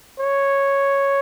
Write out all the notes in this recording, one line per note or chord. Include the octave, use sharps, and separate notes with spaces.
C#5